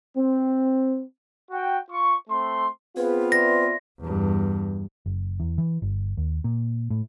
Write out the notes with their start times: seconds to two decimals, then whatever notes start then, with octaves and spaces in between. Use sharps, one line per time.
0.16 C4
1.51 F#4 G5
1.90 F4 C#6
2.29 A3 C4 C6
2.97 B3 C4 F4 G#4 B4
3.32 D5 E5 C6 A#6
4.00 E2 G2
5.06 F#1
5.40 E2
5.58 E3
5.82 G1
6.17 D#2
6.44 A#2
6.90 A2